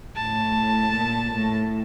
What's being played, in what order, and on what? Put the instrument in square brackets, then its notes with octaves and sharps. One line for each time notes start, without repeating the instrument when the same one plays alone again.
[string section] A2 [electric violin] A5
[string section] A#2
A2